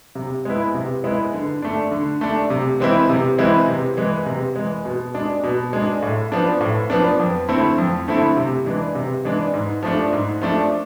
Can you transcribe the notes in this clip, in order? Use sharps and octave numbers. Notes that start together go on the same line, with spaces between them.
C3
G#3 B3 E4
C3
G#3 B3 E4
D3
A3 D4
D3
A3 D4
C3
E3 G#3 C4 E4
C3
E3 G#3 C4 E4
C3
E3 G#3
C3
E3 G#3
B2
G#3 D4
B2
G#3 D4
A2
F3 B3 D4
A2
F3 B3 D4
F2
D3 A3 C4 E4
F2
D3 A3 C4 E4
C3
E3 G#3 D4
C3
E3 G#3 D4
G#2
F3 A3 D4
G#2
F3 A3 D4